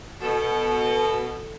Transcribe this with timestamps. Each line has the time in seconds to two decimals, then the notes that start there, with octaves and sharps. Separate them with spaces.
0.21 B2 A4